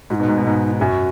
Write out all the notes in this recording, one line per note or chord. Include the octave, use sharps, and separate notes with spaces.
G#2 F#4
D#4
B2
G#2
B2
G#2
F#2 F#4 G#4